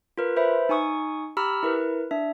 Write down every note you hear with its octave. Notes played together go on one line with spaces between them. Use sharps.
F4 A#4 B4
B4 C5 E5 B5
D#4 G#5 C#6 D#6
G4 A#5 B5 E6 F6
E4 A#4 B4
D4 E5